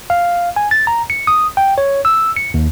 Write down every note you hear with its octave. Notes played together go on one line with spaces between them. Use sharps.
F5
G#5
A6
A#5
C#7
D#6
G5
C#5
E6
C#7
D#2